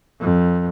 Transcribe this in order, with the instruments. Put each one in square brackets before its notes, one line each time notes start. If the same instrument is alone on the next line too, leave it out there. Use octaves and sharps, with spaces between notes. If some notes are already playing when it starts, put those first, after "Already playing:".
[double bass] F2